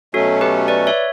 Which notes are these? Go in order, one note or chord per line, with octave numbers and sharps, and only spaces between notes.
B2 F#3 A3 C#4 F#4 A4
G4 B4
B4 D5
C#5 E5